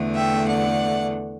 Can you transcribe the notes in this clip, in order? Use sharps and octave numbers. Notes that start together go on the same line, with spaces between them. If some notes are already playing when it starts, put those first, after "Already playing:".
Already playing: E2 D3 A3
E5 G5
D5 F#5